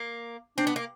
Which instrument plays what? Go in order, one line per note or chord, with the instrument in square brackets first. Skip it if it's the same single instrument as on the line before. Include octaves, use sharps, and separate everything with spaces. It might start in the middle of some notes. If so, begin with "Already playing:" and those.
Already playing: [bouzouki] A#3
[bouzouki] C4 [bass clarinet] D4
[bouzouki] B3
A#3